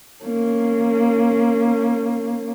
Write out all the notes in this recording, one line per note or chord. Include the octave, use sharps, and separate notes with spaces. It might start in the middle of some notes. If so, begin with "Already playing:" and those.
A#3 C#4